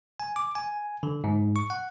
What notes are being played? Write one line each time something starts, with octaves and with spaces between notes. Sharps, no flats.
G#5
D6
G#5
D3
G#2
C#6
F#5